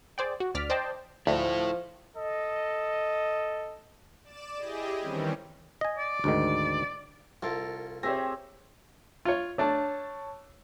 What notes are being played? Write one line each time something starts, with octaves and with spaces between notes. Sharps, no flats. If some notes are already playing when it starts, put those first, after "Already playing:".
G#4 C5 D5 G5
F#4
D2 D5 F6 B6
C5 D5 D#5 G5 A5
D2 F3 E4 A4
A4 D#5
D5 D6 E7
E4 G4 G#4 D#5
D#3 E3 G3 C4 C#4
D#5 G#5
D5
D2 G#2 D#3
C2 F4 A4 A#4
C4 G4 G#4 C#5 E5 A#6
F4 C#5
A3 D4 C#5 A5